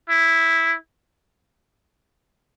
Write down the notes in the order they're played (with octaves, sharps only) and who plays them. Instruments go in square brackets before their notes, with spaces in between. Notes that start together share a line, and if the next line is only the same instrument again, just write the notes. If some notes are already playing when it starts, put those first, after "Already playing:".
[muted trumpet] E4